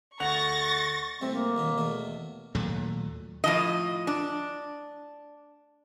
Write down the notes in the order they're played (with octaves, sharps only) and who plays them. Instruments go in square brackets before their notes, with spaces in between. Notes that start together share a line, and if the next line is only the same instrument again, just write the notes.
[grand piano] D2 F#5 F7 [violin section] C#6 A6 A#6
[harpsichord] C2 C3 A3 [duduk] C4
[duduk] A#3
[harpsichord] D#2 B2 E3
E2 B2 A3
[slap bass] D#2 A#2 F#3 A3
[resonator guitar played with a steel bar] A2 F3 D#5
D4